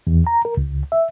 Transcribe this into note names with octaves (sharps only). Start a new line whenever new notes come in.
E2
A#5
A#4
C#2
E5